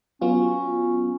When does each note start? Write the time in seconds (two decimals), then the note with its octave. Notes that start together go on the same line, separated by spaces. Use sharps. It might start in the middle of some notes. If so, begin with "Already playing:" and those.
0.21 F#3 B3 C#4 F4